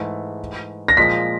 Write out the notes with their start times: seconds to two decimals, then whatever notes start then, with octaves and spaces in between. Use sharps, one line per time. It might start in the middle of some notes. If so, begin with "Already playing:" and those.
Already playing: G#2 E3 A3
0.88 A#6
0.97 A#2 F3 G#3 B6